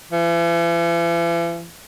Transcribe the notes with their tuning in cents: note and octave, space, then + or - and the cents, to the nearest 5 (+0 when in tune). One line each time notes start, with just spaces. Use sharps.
E3 +45